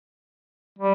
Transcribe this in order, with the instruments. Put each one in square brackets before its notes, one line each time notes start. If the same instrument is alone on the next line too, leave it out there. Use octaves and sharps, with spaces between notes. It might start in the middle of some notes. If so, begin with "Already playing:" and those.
[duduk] G3